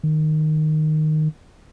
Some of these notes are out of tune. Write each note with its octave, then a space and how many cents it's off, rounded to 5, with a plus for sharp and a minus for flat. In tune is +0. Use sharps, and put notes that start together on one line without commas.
D#3 -10